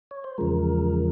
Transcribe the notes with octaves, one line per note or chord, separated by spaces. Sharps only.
C#5
C5
E2 C#3 F3 G#3 A#4